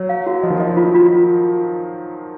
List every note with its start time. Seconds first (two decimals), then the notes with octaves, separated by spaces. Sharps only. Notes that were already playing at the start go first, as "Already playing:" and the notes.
Already playing: F#3 C#5
0.09 F5
0.27 F#4
0.43 F3 D#5
0.50 D#3
0.58 F3 D#5
0.77 F4
0.94 F4